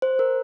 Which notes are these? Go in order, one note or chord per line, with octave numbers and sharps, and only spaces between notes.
C5
A#4